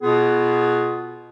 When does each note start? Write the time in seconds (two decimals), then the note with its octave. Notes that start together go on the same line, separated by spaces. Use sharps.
0.02 B2 B3 F4 G#4